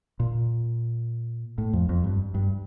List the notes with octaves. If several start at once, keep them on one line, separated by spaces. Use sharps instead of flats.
A#2
A2
F2
F2
G2
G2